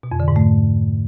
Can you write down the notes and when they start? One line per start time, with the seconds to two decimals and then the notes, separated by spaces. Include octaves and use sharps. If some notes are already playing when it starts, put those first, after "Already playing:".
0.03 B2
0.12 F2
0.20 D3
0.28 G#2
0.36 A3